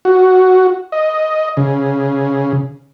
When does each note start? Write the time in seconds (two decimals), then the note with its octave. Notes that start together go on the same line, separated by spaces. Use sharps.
0.05 F#4
0.92 D#5
1.57 C#3